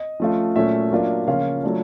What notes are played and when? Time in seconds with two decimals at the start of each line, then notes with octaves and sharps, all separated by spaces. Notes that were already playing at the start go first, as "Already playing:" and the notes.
Already playing: D#5
0.20 F3 A3 C#4 F4
0.56 A#2 F#3 A3 C#4 E5
0.91 F#3 A#3 D4 F4
1.27 C#3 F3 A#3 C#4 F4 F5
1.63 F#3 A3 D4 F4